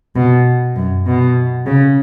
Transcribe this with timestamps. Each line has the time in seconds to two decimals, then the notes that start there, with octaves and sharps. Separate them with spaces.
0.16 B2
0.76 F#2
1.06 B2
1.66 C#3